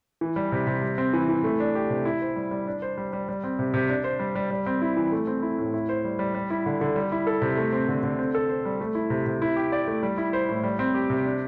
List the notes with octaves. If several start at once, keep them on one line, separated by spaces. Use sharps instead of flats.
E3
G3
C3
C3
G3
C4
E3
E3
A3
D4
G4
C3
E4
C5
G3
G3
D4
C5
G3
G3
G3
C4
C3
C3
D4
C5
G3
G3
G3
C4
E4
E3
A3
C4
E4
A2
E4
C5
G3
G3
G3
E4
D3
D3
G3
E4
A4
C3
A3
C4
D3
D3
C4
A4
C5
G3
A3
E4
C3
C3
E4
G4
D5
A3
G3
E4
C5
A2
G3
C4
G4
C3
D4